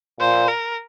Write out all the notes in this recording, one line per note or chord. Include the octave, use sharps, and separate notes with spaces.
A#2 C5
A#4